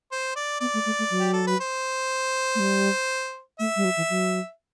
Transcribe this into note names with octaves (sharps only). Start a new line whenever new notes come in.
C5
D5
B3 D5
A3
A3
A3
F#3
G4
A4
B4
C5
A3
G3
A3 E5
G3
F#3
E3
F#3